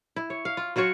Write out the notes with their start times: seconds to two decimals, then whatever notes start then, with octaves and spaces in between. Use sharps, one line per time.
0.16 E4
0.30 C#5
0.45 F5
0.57 F4
0.76 F#3 F4 F#4 C#5